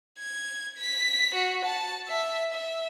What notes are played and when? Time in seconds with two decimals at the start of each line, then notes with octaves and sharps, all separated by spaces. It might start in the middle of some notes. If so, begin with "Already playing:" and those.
0.19 G#6
0.77 B6
1.34 F#4
1.65 A5
2.08 E5
2.53 E5